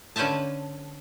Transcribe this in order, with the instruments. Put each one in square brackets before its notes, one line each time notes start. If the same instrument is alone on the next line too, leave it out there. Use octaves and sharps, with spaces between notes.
[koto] D3 C#4 B4 C5 E5 A5